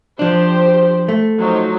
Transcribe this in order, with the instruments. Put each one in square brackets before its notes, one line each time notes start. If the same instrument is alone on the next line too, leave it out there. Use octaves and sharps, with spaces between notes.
[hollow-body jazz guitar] F3 D4 [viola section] G4 C5
[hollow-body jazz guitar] A3
[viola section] F3 F#3 D#4